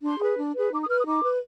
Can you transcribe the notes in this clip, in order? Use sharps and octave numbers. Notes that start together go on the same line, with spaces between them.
D4 C6
G#4 B4
D4
G#4 B4
D#4 D6
D#6
B4 F6
D#6
D#4 D6
B4